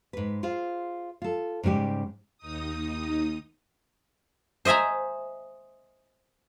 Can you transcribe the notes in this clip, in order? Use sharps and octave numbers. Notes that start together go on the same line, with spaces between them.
G#2 B4
F4 G#4 C5 F5
F4 A4
G#2 C#3 G3 G4
D#2 D#4 D#6
C5 D#5 E5 G#5 A#5